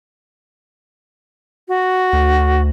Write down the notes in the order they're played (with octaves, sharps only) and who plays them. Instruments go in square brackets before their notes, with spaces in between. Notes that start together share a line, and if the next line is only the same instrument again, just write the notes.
[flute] F#4
[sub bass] D2